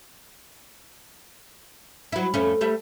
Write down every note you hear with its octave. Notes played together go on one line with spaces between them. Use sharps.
F#3 E4
F2 A3 C#4
G3 A3 E5